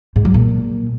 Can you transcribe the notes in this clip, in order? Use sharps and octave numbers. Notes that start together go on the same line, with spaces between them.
G#2
F#3
A#2